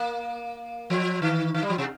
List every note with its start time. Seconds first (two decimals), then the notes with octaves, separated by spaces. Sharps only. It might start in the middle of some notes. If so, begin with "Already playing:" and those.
Already playing: A#3
0.90 F3
1.22 D#3
1.54 D#3
1.63 G3
1.70 F3
1.78 C3